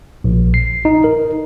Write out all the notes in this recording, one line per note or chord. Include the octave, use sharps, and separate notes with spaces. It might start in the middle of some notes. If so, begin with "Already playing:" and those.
A#1
C7
D#4
A#4